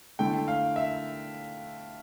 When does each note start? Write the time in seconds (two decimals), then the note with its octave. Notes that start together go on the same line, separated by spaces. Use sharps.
0.19 D3 A3 E4 G5
0.48 F5
0.76 E5